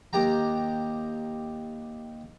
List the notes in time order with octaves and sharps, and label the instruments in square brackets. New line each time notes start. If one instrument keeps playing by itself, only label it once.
[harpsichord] D#2 G4 G5 A#5